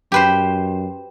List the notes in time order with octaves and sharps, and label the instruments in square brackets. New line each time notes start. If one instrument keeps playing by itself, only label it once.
[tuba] F#2 [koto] G4 B4 C5